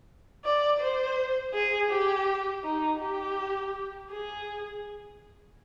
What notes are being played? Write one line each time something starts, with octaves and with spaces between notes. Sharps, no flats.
D5
C5
G#4
G4
D#4
G4
G#4